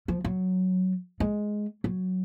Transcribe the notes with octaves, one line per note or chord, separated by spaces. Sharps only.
F3
F#3
G#3
F#3